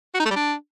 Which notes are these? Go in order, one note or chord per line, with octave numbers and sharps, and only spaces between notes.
F#4
D#4
A3
G3
D4